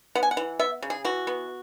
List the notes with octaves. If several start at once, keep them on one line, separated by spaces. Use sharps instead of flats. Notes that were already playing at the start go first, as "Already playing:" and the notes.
B3 F#5
G#5
F#5
E3
B3 E5
C#3
G#4
E3 F#4
B3